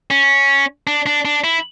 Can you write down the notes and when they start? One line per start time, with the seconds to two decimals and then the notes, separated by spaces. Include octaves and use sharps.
0.11 C#4
0.87 D4
1.06 D4
1.25 D4
1.44 E4